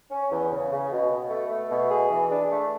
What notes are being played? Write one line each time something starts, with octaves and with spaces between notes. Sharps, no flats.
C#4
E2
C#3
C#3
B2
B2
A3
A3
B2
G#4
E3
D4
A3